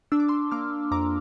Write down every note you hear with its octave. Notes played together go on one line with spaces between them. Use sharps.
D4 E6
D6
C6 E6
A#3 D6 F6
F2 A#5 D6